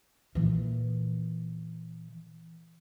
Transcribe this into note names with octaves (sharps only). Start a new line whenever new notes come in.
A#2 E3